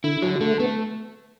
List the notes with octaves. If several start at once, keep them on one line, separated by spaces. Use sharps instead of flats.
D3 E4
D3 F#3
D3 A3
A3 B3